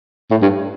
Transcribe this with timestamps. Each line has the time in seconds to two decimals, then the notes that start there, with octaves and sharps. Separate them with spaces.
0.31 A2
0.42 G2